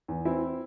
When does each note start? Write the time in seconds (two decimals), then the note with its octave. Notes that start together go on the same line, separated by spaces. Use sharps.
0.08 E2
0.25 E3 C4 E4